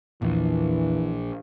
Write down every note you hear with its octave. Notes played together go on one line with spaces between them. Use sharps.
A#1 E2 A#2 E3